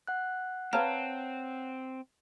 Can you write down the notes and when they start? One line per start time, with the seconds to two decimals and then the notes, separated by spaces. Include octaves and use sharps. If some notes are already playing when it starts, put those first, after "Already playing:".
0.07 F#5 F#6
0.73 C4 B4 C#5 F5 A5 A#5 F6